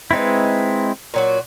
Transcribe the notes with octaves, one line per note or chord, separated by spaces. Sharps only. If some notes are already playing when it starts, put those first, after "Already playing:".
G#3 C4 D#4 E4 B4
A#2 F#3 F#4